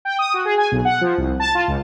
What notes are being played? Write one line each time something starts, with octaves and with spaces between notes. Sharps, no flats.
G5
D#6
F#4
G#4
G#5
B1
F#5
F3
C2
A5
F4
C#2